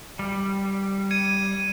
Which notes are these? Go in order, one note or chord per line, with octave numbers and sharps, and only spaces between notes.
G3
G#6 C#7 D#7